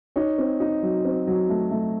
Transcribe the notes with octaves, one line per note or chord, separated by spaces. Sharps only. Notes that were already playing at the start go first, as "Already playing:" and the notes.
D#4 C#5
C4
D#4
F#3
C4
F#3
A3
A3